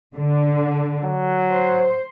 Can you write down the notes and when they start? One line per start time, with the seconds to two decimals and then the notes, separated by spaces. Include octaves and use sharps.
0.16 D3
1.04 F#3
1.51 C5